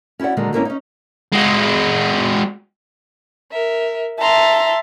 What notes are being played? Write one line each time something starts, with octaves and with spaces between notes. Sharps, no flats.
C#4 E4 F#4 D5 F#5
A#2 D3 D#3 F#3 G#3 A#3
G#2 D3 A#3 C4 C#4 E4
C#4 D#4
G#3 F#4
A#4 E5
E5 A5 A#5 C6